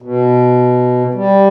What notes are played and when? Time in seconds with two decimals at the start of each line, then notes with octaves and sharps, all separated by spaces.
0.02 B2
1.15 G3